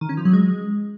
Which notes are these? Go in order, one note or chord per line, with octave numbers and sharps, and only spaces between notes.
D#3
C#4
F3
F#3
G#3